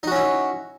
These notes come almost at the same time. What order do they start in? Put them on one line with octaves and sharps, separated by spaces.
D#4 F#4 C#4 E4